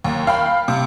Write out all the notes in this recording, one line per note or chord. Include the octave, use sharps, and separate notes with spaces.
D#2
F5 G5 B5
C3